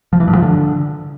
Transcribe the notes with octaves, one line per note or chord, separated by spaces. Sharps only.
F3
E3
G2
F3
D3